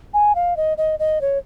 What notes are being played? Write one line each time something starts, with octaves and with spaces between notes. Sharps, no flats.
G#5
F5
D#5
D#5
D#5
C#5